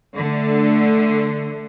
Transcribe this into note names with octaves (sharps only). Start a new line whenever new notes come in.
D3 A3